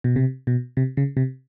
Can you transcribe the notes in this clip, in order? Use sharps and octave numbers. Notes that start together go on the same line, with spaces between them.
B2
C3
B2
C3
C#3
C3